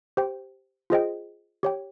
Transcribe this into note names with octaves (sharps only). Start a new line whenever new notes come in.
G4 C5 G5
F4 G#4 C5 D#5 G5
G4 C#5 G5